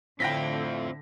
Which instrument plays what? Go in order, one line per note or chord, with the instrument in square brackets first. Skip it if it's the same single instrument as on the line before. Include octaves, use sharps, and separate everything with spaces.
[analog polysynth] A2 E4 [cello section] D3 [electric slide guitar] C4 F4 [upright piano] G5 A#6 B6